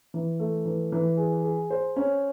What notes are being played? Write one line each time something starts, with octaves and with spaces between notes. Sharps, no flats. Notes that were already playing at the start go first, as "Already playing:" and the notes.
E3
A3
E3
E3
G#4
G#4
C5
C#4